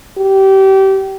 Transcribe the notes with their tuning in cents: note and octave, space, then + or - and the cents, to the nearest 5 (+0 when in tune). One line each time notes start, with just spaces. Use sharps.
G4 -25